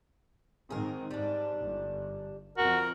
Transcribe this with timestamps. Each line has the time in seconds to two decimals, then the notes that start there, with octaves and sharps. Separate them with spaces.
0.70 G#2 D#3 C4 G#4 A#4
1.10 G#2 G3 D4
1.60 G1
2.58 F2 F#4 A#4